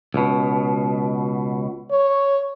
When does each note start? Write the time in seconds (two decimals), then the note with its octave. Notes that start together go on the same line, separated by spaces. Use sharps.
0.14 C#2 B2
1.91 C#5